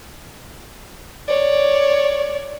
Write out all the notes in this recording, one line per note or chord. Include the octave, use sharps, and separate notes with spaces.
C#5 D5